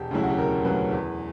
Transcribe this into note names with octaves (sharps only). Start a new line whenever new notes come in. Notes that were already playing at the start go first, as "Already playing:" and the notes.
Already playing: E1 G4
D2 C#3 F#3 E4
F#4
G4
E1 A#4
D2 C#3 F#3 B4
E2